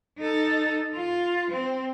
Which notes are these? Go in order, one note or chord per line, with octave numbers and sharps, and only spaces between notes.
D#4 A4
F4
C4